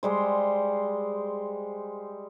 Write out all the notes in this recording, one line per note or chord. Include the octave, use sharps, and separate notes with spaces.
G3 G#3 C5